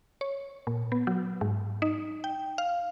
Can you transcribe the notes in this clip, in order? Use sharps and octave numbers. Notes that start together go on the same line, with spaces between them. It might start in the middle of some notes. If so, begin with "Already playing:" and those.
C#5
A#2
B3
F#3
G#2
D#4
G5
F5